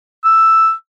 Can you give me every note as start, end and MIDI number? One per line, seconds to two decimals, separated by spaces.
0.24 0.72 88